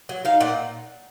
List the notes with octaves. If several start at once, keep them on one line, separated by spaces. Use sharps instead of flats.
F#3
D#4 F5
A#2 F#5